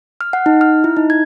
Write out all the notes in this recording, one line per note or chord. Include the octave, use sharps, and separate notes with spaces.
F6
F#5
D#4
F6
E4
D#4
G#6